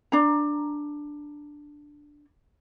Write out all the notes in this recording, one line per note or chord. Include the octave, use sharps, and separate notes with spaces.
D4 A#5